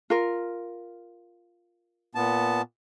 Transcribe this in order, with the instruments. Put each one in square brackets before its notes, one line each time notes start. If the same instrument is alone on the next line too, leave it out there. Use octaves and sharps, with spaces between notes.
[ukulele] F4 A#4
[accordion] A#2 B3 A5